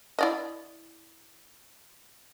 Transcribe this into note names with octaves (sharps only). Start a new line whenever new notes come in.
E4 D5 D#5